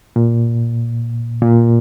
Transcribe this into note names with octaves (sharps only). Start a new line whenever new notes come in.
A#2
A#2